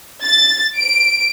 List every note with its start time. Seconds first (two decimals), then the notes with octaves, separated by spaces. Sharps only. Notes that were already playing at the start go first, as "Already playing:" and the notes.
0.23 A6
0.78 D7